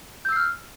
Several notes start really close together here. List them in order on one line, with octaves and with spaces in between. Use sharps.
G6 E6 C7 F6